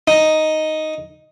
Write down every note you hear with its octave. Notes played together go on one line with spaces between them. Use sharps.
D#4